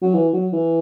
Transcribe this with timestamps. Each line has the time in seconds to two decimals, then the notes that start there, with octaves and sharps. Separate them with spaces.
0.02 F#3
0.14 E3
0.33 F#3
0.53 E3